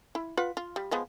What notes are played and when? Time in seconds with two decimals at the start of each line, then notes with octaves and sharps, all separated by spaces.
0.15 E4
0.37 F4 B4 F#5
0.57 F4
0.76 G3
0.91 F3 G#3 B3